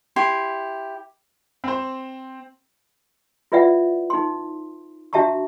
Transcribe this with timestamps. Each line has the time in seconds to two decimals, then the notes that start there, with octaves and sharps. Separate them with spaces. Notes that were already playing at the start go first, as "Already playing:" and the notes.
0.16 E4 G4 C6
1.64 C4 C5
3.52 E4 F4 B4 D5 E5 F#5
4.10 D#4 C6
5.13 D4 F#4 E5 A5 A#5 C#6